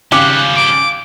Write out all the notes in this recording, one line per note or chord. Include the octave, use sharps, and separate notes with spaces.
G#1 C#3 F3 G3 G4 F#6 C#7
D6